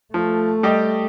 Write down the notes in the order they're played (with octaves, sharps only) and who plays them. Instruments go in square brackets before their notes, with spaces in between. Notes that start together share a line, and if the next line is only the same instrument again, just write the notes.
[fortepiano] F3 [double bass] A3
[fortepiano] G3 G4 D#5